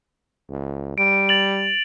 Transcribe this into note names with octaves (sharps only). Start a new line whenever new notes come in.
C#2
G3 D7
A6 F7 F#7